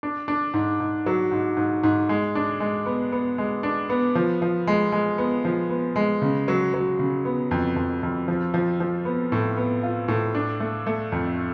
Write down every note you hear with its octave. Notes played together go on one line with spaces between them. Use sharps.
D4
D4
G#2
G#2
F#3
G#2
G#2
G#2
G#3
D4
G#3
B3
B3
G#3
D4
B3
F3
F3
G#3
G#3
B3
F3
B3
G#3
C#3
F#3
F#3
C#3
B3
F2
F2
F2
F3
F3
F3
B3
A2
B3
F4
A2
D4
A3
A3
F2